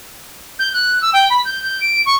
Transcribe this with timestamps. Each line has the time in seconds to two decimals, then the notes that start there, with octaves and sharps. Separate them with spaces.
0.59 G6
0.73 F#6
1.02 E6
1.13 G5
1.30 B5
1.45 G6
1.63 G6
1.81 D7
2.06 C#6